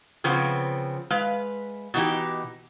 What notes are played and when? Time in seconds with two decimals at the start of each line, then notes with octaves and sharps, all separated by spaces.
0.24 C#3 F3 B3 C4
1.10 G#3 B4 F5
1.94 B2 E3 D#4 G4